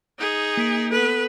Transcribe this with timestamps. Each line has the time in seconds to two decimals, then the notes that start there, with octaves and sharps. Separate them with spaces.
0.18 D#4 G#4
0.57 A#3 B6 D7
0.92 B3 A4 B4